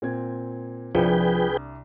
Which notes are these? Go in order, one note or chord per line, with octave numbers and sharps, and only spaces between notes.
A#2 C4 G#6
C2 F3 D4 G#4 B4 G5